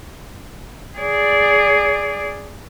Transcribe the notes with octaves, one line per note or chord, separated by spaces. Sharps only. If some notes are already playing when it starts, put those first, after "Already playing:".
G#4 D5